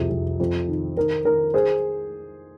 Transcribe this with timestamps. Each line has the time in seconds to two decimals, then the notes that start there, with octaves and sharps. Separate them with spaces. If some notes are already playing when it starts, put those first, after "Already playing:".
Already playing: C2 F2 C3 G#4
0.10 F2
0.40 F2
0.68 D#3
0.96 D#3 A#4
1.25 D#3 A#4
1.54 G#4 C5